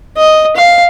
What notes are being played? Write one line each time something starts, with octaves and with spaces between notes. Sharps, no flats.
D#5
F5